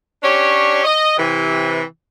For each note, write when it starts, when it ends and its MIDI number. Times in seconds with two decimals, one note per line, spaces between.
0.23 0.81 61
0.23 0.81 62
0.23 0.81 67
0.23 0.81 73
0.84 1.14 75
1.17 1.82 48
1.17 1.82 52